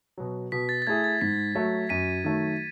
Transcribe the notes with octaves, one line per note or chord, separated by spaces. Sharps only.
B2 F#3
B2 B6
A6
A6
A3 E4 G#4 G#6
A6
G#2 B6
F#3 A3
F#2 B6 D#7
D#3 F#3 A3